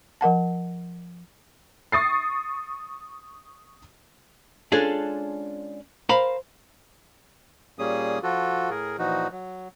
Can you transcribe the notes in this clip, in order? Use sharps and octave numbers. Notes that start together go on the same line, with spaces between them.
F3 A#4 F#5 A5
C#6 D#6 A6 C7
G#3 C#4 D4 F4 G#4 A4
A#4 C5 F5 A#5 B5
A#2 G3 A#3 C#4 G#4 D#6
F3 F4 F#4 A4
A2 G#4 A#4
A#2 E3 F3 D#4 F#4
F#3